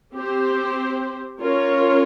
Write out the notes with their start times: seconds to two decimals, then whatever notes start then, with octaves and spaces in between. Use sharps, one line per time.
0.14 C4 G4 C5
1.40 C#4 F4 A#4 C#5